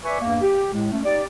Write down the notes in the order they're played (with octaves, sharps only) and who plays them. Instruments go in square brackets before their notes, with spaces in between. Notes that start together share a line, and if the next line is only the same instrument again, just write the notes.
[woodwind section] B4 D5 E5 G#5 C#6
E2 G2 A#3
G4
A2 G#3
A3 C#4
D#4 G4 D5